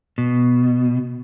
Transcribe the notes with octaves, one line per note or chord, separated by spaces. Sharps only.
B2